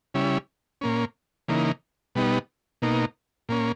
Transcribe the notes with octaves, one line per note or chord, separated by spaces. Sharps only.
C#3 G3 C#4 E4
A#2 A#3 C#4
C#3 E3 A#3 D#4
B2 G3 B3 D#4
B2 A#3 D#4
A#2 A#3 C#4